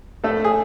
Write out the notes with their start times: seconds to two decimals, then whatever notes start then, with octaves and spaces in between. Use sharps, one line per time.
0.24 A2 A3 A4
0.44 G#4